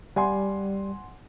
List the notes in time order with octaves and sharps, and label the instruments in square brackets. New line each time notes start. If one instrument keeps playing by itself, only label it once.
[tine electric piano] G3 [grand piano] F#5 G#5 C6